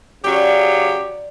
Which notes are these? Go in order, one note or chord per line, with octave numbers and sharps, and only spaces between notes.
C#3 F#3 G4 D5